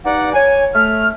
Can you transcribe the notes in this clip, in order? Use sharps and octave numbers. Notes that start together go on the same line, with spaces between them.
G2 D#4 D5 F#5
C#5 G#5
A3 F6